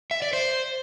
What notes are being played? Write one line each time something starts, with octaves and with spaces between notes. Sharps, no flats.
E5
D5
C5